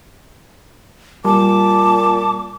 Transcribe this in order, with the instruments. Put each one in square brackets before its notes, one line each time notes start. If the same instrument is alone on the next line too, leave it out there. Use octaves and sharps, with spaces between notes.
[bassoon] A#2 [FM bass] G3 [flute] A5 [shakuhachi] D6